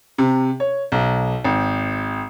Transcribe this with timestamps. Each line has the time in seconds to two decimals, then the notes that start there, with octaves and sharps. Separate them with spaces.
0.18 C3
0.60 C#5
0.92 B1
1.45 G#1